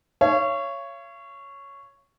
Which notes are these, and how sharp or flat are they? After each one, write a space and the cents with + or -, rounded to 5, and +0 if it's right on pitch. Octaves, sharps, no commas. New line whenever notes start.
C#5 +0 F5 -45